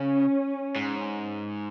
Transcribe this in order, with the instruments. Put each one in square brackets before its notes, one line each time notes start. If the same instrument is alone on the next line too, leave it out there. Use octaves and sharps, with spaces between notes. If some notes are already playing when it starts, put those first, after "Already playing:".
Already playing: [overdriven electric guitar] C#3 [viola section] C#4
[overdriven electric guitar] G#2